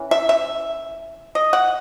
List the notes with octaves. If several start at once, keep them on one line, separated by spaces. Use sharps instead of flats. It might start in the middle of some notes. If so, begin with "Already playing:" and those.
Already playing: E3 C#4
E5
E5
D#5
F#5